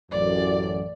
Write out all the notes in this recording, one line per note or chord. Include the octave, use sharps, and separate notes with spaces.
A1 F#2 D5